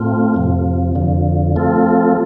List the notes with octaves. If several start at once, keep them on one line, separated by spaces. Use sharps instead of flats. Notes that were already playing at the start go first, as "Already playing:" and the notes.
Already playing: A2 A3 C4 F4
F2 C3 F3
F2 D3 F3
F3 A3 C4 F4 A4